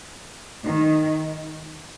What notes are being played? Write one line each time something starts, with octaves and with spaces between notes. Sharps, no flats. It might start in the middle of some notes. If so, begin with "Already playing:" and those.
D#3